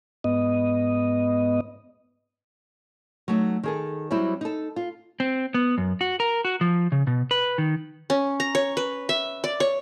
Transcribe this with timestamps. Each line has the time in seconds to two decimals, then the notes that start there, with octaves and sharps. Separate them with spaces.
0.24 G#2 B3 D#5
3.28 F#3 A3 D#4
3.63 D#3 G#4 A4
4.11 F#3 G3 C4 E4
4.41 D#4 A4
4.76 F4
5.20 C4
5.54 B3
5.78 F#2
6.01 F#4
6.20 A#4
6.45 F#4
6.61 F3
6.92 C#3
7.07 B2
7.31 B4
7.58 D#3
8.10 C#4
8.40 A#5
8.55 C#5
8.77 B4
9.09 E5
9.44 D5
9.60 C#5